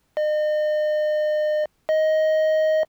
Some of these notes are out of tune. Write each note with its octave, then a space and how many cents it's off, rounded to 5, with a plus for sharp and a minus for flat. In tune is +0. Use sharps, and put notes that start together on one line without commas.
D#5 -40
D#5 +10